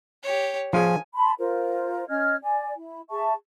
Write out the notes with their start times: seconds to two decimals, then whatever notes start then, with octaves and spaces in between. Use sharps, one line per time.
0.23 G4 C#5
0.73 F3 F4 G#4 G#5
1.14 A5 B5 C6
1.39 F4 A#4 C5
2.09 C#4 D#5 F6 G#6
2.42 D5 G#5
2.76 E4
3.10 G#4 E5 A5 C#6